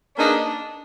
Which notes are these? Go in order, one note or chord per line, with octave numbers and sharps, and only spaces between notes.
A#3 D4 D#4 G#4 B4 D#5